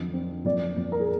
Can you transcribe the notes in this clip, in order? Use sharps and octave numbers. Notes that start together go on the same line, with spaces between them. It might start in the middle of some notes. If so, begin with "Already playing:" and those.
Already playing: F2 D3
C4
F2 D5
F2
A#4
G#4